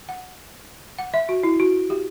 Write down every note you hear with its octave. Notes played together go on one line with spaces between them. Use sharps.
F#5
F#5
E5
F#4
E4
F#4
G4